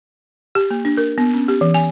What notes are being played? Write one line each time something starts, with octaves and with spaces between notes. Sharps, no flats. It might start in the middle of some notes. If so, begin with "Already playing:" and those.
G4
A#3
D4
A#4
B3
C#4
G4
E3
G#5